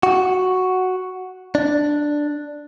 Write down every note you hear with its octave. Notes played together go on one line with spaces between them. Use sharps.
F#4
D4